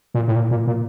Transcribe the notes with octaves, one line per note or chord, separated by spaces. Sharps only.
A#2
A2
A#2
A#2
A#2